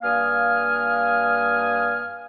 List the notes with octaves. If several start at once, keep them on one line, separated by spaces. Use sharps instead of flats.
G2 A#3 F5 G#5 D#6 F6